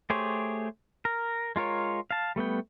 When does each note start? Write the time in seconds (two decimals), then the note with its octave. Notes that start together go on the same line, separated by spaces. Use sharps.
0.10 A3 G4 G#4 C5 C#5
1.05 A#4
1.56 G#3 F4 A#4 C#5
2.11 F5 A5
2.36 G3 A3 B3 G5